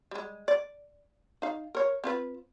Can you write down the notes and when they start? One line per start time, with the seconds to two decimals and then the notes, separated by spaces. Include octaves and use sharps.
0.11 G3 G#3
0.48 D5
1.42 D#4 F5
1.75 A#4 C#5
2.04 C4 F4 B4